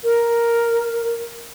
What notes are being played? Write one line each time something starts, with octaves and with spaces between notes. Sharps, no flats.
A#4